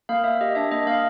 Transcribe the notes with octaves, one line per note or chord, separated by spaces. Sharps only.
A#3 F5
A#3 E5
G4 D#5
D4 E5
A#3 D#5
A#3 F5